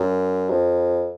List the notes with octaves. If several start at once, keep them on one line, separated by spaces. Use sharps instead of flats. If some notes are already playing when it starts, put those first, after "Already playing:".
Already playing: F#2
F2